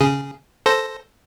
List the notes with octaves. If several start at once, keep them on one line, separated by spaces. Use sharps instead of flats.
C#3 G#4
A4 C5 A#6